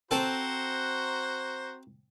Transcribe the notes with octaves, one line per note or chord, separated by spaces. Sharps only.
C4 F#4 A4 C5 A#5